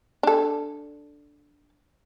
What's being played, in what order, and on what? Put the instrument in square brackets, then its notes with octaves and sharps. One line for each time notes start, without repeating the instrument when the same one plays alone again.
[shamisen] D4 A4